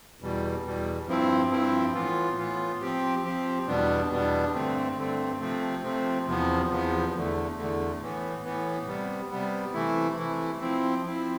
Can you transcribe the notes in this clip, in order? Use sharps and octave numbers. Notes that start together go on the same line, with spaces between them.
E2 B2 G3
E2 B2 G3
G2 F3 C4 E4
G2 F3 C4 E4
A2 E3 B3 F4
A2 E3 B3 F4
F3 C4 G4
F3 C4 G4
E2 B2 G3 B3 D4
E2 B2 G3 B3 D4
G2 D3 A3 C4
G2 D3 A3 C4
C3 F3 A3 C4
C3 F3 A3 C4
E2 C3 F3 B3
E2 C3 F3 B3
E2 D3 A3
E2 D3 A3
A2 E3 B3
A2 E3 B3
C3 G3 B3
C3 G3 B3
C3 E3 A3 E4
C3 E3 A3 E4
F3 C4 E4
F3 C4 E4